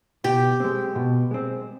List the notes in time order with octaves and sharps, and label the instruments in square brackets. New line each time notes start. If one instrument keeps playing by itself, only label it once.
[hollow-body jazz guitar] B2 [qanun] G4
[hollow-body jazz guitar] G#3 C4
B2
G#3 C4